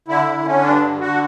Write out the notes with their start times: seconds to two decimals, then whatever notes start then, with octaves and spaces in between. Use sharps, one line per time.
0.08 D3 E4
0.26 D3
0.45 D3 C#4
0.63 G2 D4
0.81 D3
0.99 D3 F#4